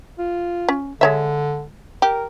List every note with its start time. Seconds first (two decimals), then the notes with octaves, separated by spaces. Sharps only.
0.18 F4
0.68 C#4
1.01 D3 G#3 C#5 E5
2.02 G4 A#4